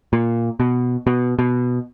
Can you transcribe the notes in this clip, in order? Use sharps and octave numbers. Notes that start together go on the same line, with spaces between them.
A#2
B2
B2
B2